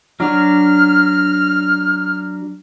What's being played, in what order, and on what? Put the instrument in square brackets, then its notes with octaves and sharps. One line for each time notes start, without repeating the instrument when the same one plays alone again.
[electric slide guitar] F#3 D4 F#4 [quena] F6